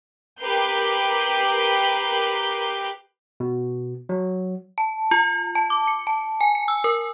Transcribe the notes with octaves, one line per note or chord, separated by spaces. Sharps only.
G4 A#4 B4 G6 C7
B2
F#3
A5
F4
A5
D6
C#7
A5
G#5
C#7
E6
A#4